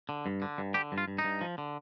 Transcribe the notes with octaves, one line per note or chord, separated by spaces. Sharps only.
D3
G2
D3
G2
D3 G4
G2
F4
G2
D#4
G2
F3
D3